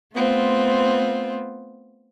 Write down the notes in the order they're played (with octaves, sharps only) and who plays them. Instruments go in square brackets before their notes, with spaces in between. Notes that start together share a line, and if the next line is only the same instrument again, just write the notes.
[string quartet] A3 B3 C4 F4